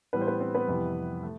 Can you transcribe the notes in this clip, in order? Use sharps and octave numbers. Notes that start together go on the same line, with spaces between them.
A2 E3 G3 B3 B4
C5
B3 B4
C4 C5
B3 B4
F2 C3 E3 G3
A3